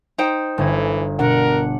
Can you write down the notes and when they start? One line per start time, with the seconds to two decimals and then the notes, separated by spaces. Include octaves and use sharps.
0.18 D#4 C5 G5
0.58 G1 E3 G#6
1.19 B2 D4 A#4 F#5